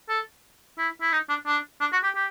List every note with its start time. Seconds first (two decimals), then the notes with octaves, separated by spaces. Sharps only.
0.09 A4
0.78 E4
1.02 E4
1.12 D#4
1.30 D4
1.47 D4
1.81 D4
1.93 F#4
2.04 G4
2.15 G4